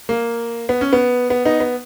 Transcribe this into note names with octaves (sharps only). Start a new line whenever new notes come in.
A#3
B3
C#4
B3
B3
B3 D#4
B3